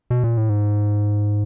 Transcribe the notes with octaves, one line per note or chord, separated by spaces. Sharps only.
B2
A#2
A2
G#2